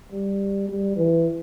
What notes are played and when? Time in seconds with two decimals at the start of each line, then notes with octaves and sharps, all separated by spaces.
0.12 G3
0.68 G3
0.96 E3